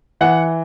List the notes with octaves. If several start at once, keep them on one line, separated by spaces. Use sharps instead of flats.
E3 F#5